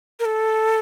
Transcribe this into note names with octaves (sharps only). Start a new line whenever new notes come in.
A#4
A4